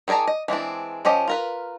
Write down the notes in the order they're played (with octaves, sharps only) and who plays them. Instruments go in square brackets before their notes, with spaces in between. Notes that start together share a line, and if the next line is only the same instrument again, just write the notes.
[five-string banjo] D#3 G#4 D5 A5 A#5
D#5
E3 G#3 C4 D4
F3 C#4 G4 D#5
F4 A#4 B4